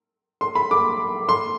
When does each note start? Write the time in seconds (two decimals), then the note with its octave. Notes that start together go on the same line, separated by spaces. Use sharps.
0.41 C6
0.55 B5
0.71 D6
1.29 C6